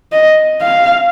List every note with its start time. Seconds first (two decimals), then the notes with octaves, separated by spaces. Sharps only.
0.13 D#5
0.62 F5